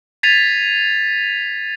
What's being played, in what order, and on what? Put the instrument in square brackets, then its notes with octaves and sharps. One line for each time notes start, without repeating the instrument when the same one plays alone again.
[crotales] G#6 A6 B6 C7 D#7 F7